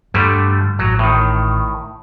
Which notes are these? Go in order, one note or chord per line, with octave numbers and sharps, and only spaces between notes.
G2 D3 G3 A3
A1 F#3
A2 D#3